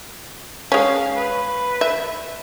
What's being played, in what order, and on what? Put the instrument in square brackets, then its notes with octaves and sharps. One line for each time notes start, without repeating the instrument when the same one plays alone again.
[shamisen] G#3 C#4 [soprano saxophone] F5
[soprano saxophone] B4
[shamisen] E5